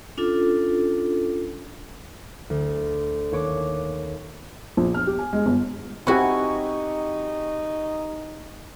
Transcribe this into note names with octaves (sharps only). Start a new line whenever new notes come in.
C#4 D4 F4 A4
D2
D#2 C#5 D6
A#1
F6
G4
G#5
G#3
G1
C4 D#4 E4 F#4 G4 G#5 C#6